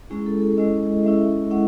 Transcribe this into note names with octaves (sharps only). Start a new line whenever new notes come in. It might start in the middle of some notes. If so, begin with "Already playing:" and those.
G#3 C#4 E4 G#4
A4
A4
G#3 C#4 E4 D#5
G#3 C#4 E4 E5
G#3 C#4 E4 F#5